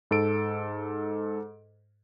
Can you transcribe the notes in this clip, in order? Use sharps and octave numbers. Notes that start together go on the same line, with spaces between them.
G#2 A4 D7